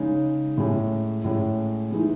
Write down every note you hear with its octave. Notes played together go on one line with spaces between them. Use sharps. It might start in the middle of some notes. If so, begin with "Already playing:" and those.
Already playing: C#3 G#3 D#4
A2 G#3 C#4
A2 G#3 C#4
E3 G#3 D#4